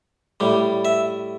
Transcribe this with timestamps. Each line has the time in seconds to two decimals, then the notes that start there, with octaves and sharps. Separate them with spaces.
0.40 A2 G3
0.85 E5